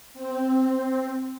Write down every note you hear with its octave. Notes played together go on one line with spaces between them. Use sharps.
C4